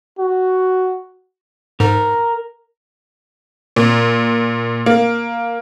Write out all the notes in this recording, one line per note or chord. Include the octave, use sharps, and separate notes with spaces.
F#4
G#2 A#4
A#2
A#3